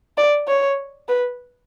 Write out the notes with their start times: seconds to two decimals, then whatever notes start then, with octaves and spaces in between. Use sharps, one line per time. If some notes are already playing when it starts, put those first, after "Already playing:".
0.18 D5
0.48 C#5
1.09 B4